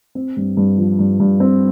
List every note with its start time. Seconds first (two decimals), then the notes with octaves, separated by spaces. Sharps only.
0.15 C4
0.37 G2
0.57 G2
0.78 F3
0.99 G2
1.20 G2
1.40 C4